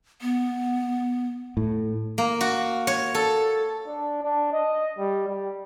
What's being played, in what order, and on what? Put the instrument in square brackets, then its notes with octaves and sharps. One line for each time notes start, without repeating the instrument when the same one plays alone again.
[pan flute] B3
[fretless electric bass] A2
[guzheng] A#3
F#4
C#5
A4
[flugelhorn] D4
D4
D#5
G3
G3